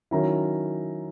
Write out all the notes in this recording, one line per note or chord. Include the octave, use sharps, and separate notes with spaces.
D#3 F#3 C#4 E4 A#5